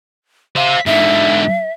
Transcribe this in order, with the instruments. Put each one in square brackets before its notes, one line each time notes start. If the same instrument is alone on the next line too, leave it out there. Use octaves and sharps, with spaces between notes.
[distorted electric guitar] C5 E5 [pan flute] F5
[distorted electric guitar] G#2 D3 [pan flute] E5